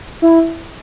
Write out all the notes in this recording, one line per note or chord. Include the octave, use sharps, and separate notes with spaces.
E4